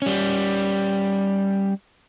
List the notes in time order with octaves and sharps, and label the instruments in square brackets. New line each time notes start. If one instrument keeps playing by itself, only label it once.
[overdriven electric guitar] G3 C#4